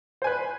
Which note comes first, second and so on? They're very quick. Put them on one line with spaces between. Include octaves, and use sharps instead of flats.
C5 G#5 B4